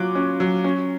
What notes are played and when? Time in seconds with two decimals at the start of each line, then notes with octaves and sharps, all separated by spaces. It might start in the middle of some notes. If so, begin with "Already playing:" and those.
Already playing: F#3 F4 D6 F#6
0.15 C#4
0.40 F#3
0.64 C#4